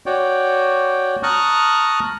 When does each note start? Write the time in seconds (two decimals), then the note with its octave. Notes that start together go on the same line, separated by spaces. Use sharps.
0.06 F#4 C#5 D5 G5
1.23 A5 A#5 C#6 D#6 F6 F#6